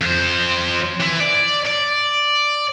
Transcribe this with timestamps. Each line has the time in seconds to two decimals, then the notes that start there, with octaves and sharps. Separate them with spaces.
0.01 F2 C5
1.00 E3 E4
1.20 D5
1.67 D5